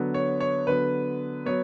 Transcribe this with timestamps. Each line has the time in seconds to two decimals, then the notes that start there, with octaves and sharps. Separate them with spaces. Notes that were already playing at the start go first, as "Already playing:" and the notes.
Already playing: D3 F#3 B3
0.14 C#5
0.40 C#5
0.67 D3 F#3 B3 B4
1.46 F#3 B3 C#5